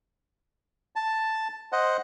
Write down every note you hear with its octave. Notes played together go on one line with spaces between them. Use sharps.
A5
C5 D#5 F#5